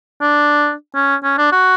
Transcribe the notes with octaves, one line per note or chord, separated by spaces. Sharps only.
D4
C#4
C#4
D4
F#4